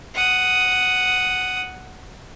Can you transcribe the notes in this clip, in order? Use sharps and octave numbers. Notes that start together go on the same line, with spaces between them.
F#5 D#6